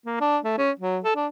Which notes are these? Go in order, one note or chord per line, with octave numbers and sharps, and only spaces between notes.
A#3
D4
A3
C#4
F#3
A4
D4